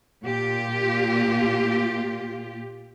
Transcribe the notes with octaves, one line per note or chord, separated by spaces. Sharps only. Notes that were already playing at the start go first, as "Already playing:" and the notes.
A#2 F4 G4